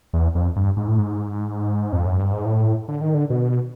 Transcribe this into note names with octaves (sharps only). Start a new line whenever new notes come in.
E2
F2
G2
G#2
A2
G#2
F2
F#2
G2
G#2
A2
D3
D#3
D3
B2